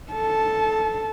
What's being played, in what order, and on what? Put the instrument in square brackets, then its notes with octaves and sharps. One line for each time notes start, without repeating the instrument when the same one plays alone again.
[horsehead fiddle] A4 A5